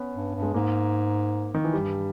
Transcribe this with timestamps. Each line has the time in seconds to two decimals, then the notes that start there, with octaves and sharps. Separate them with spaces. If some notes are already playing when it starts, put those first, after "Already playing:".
Already playing: B3 C#4
0.15 G2
0.35 G2
0.42 G#3
0.54 G#2 A#3
1.54 D#3
1.64 E3
1.73 G2 G3